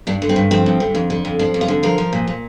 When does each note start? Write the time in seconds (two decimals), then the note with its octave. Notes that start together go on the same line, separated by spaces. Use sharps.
0.07 G2 D4
0.22 D3
0.29 C4
0.36 G2
0.51 F3 C4
0.66 G2
0.80 D3
0.95 F2
1.10 D3
1.25 F2
1.39 F3 D4
1.54 F2
1.61 F4
1.68 D3
1.83 F3 A#4
1.98 F3
2.13 A#2
2.27 A#2